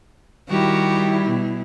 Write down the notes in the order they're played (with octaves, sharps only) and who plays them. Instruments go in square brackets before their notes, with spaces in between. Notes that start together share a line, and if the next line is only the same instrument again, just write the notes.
[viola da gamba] D#3 F#4 G4 [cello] G3 E4
[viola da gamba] B2